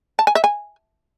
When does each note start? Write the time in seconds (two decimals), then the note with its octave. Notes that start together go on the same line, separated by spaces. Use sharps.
0.19 A5
0.27 G#5
0.35 E5
0.44 G#5